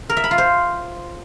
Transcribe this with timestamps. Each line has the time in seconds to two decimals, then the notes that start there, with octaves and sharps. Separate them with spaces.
0.09 A#4
0.17 E5
0.24 B5
0.31 F4
0.38 C5